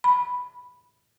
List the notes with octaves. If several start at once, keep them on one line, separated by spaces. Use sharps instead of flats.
B5